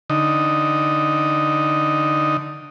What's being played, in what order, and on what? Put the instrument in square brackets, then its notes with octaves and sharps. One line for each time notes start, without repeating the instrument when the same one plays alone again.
[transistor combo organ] D3 D#4